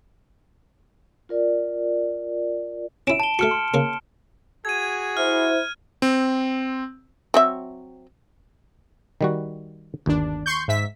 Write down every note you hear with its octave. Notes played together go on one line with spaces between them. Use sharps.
F4 A#4 D5
C#4 E4 D7 E7
A5 G7
A3 F#4 F6 C#7
C6
C#3 A#3
F#4 G#4 G#6 D#7
E4 C5 F6
C4
F#3 C4 E5
D#3 G3 F#4
G1 D#2 D4
C6 C#6 G6
G#2 E5 B6